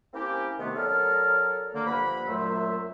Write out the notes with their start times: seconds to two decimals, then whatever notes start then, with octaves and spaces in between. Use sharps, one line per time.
0.14 A#3 C4 C#4 E4 G4
0.59 C3 D#3 A3 B3
0.76 F#3 A4 A#4 D5 F6
1.74 D3 A#3
1.87 G2 F3 F#5 B5
2.27 F#2 A#2 F#3 A3 C5 E5